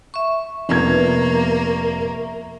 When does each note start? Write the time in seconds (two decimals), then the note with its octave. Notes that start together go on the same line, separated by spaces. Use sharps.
0.14 E5 C#6
0.69 F1 A#3 B3 G#6